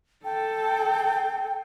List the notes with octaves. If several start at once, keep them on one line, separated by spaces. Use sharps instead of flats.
A4 G5